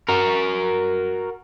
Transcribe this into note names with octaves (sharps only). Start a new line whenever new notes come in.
F#4 A#4